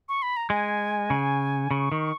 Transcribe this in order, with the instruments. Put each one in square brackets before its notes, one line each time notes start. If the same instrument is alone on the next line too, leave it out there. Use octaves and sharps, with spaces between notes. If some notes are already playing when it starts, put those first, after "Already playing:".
[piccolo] C#6
B5
A#5
[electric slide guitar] G#3 [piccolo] G#5
[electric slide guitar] C#3
[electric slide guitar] C#3 [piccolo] C#6
[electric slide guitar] D#3